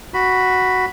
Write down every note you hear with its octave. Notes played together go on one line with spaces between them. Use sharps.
F#4 B5